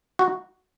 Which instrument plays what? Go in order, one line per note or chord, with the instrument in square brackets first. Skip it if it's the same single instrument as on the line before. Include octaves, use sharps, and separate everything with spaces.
[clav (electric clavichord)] F#4